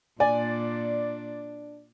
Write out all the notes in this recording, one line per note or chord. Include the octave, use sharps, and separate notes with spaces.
A#2 D4 D5 G#5